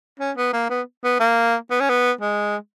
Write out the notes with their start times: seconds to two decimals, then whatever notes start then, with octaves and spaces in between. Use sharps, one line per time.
0.20 C#4
0.37 B3
0.53 A#3
0.70 B3
1.04 B3
1.20 A#3
1.71 B3
1.81 C#4
1.90 B3
2.21 G#3